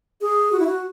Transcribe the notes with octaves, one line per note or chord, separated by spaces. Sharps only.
G#4
F#4
E4
F#4